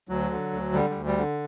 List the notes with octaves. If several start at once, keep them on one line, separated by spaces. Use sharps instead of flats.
D2 F#3
D3
D2
D3 G3
G3
D2
G3
D3